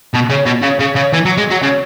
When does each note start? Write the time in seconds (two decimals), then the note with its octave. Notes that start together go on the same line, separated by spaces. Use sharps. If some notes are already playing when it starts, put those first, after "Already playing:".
0.14 B2
0.30 C#3
0.46 B2
0.62 C#3
0.79 C#3
0.95 C#3
1.13 E3
1.25 F#3
1.37 G#3
1.50 F#3
1.62 C#3